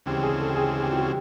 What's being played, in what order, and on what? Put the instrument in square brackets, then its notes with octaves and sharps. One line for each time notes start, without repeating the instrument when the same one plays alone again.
[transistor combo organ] D2 C#3 E3 G#3 C4 [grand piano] G4
[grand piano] G#4
A4
G4
G#4
G#4
G4
F#4
G4